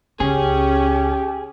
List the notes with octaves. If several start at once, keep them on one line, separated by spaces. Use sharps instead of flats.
C#2 C#4 G4 G#4